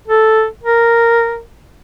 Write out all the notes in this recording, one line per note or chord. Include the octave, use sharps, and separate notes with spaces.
A4
A#4